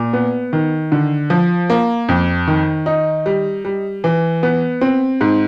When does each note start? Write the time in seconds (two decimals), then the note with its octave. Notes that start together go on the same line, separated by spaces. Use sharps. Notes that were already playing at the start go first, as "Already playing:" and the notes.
Already playing: A#2
0.13 B3
0.53 D#3
0.92 D3
1.30 F3
1.70 A#3
2.08 F2
2.48 D#3
2.86 D#4
3.26 G3
3.65 G3
4.04 E3
4.43 B3
4.81 C4
5.21 G#2